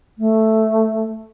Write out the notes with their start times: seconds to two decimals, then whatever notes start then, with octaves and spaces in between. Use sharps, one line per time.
0.18 A3